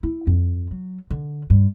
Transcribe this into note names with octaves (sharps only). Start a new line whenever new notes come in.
E4
F2
F#3
D3
G2